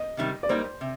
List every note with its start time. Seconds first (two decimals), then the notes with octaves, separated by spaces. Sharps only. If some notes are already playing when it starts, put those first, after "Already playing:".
Already playing: D#5
0.17 C3 D#3 G3
0.43 D5
0.49 G3 A#3 D#4 C5
0.81 C3